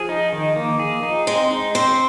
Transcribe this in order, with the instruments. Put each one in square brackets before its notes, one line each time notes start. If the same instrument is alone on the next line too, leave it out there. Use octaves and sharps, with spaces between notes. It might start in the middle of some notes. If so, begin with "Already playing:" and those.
Already playing: [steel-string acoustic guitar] F3 [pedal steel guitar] G#4
[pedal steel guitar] D#4
D#3
A#3
G#4
D#4
[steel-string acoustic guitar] G#3 [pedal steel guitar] C4
[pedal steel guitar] D#4
[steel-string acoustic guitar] C4 [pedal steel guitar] C5